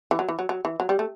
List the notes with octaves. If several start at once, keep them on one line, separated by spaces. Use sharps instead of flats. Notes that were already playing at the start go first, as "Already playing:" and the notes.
E3
F#3
E3
F#3
F#3
E3
F#3
G3
A3